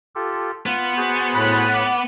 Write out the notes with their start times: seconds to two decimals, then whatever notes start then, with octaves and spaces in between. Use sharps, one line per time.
0.15 F4 G4 A4
0.66 B3 F4
0.97 F#4 G#4 C5
1.34 A2 B5 F#6
1.73 D6